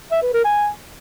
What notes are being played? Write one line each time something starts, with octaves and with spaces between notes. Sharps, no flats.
E5
B4
A#4
G#5